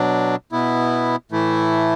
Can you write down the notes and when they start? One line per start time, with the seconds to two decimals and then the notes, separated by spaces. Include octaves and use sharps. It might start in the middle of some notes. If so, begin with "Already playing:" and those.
Already playing: B2 F#3 D4
0.52 B2 B3 E4
1.32 A2 E3 A3 E4